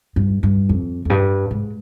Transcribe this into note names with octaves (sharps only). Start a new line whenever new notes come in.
G2
G2
F2
F2
G2
G#2